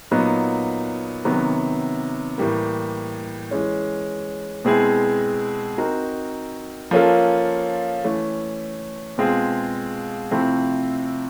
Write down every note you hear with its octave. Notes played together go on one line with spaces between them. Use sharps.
A#2 F#3 B3 D#4
C3 D#3 F#3 B3
A2 E3 G3 A#3
E3 G#3 C#4
B2 G#3 C4 E4 G#4
C4 D#4 F#4 A#4
F3 A#3 C#4 F4 A4
E3 A3 C#4
B2 G#3 C4 F4 G#4
C3 F3 A3 C4 E4